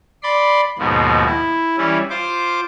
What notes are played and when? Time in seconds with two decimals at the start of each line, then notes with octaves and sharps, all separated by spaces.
0.23 D5 B5 C6
0.78 D#2 G#2 B2 F3
1.25 E4
1.78 E3 G3 C#4 E4
2.10 F4 C5 D6